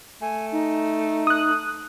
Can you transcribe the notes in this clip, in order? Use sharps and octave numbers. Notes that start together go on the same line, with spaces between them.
A3 G#5
D#4
D#6 F#6